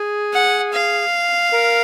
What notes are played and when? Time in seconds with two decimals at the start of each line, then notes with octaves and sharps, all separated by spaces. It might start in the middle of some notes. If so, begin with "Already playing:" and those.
Already playing: G#4
0.33 F#5
0.73 F5
1.52 A#4